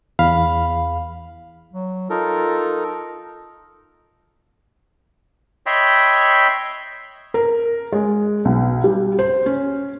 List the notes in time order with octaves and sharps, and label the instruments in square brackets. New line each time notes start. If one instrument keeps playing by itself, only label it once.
[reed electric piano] E2 F5 B5
[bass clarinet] F#3
[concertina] D#4 A4 A#4 [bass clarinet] F4
[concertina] C#5 D#5 E5 G5 B5 C6
[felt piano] A#4
G#3
B1
G3
C5
C#4